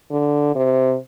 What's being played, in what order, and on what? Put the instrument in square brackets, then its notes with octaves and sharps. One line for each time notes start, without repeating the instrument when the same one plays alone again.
[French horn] D3
C3